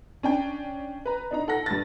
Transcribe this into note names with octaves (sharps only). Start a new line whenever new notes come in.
C#4 D4 G5
B4 A#5
D4 D#4 A#5
A4 F#5 A#6
G2 A6